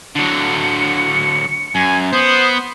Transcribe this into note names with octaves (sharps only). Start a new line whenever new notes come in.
D3 F#3 C#7
F#2 G#5
B3 C5 D#6